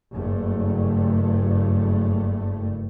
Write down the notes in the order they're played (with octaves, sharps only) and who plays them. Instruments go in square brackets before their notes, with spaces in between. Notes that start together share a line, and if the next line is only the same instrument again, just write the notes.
[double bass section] F#1 G2 A3